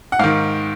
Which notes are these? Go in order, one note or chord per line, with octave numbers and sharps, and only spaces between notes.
F#5
G#2 D#3 F5